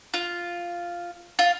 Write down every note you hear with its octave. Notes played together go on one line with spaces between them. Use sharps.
F4
F4